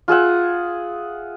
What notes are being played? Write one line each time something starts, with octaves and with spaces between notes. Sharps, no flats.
F4 G#4 E5 F#5